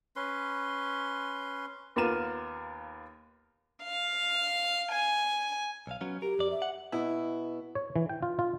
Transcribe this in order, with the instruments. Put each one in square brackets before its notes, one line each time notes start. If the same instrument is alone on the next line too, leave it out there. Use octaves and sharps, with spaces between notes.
[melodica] C#4 B4 C6
[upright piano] D#2 B3 F4 A#4 D#7 E7
[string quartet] F5
G#5
[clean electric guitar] B1 F5
F#3 B3 C#4
[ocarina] G4 [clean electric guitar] A#4
[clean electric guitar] F2 D5
[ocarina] E5
[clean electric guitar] F#5
[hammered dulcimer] B2 [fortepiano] E4
[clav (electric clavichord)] C#5
E3
G5
F4
F4